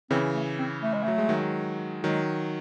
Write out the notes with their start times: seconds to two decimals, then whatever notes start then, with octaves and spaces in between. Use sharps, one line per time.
0.10 C#3 E3 C4
0.34 A3
0.58 C4
0.83 A3
0.94 G#3
1.03 F#3 A3
1.18 G#3
1.29 D#3 F#3
2.04 D#3 F#3 G#3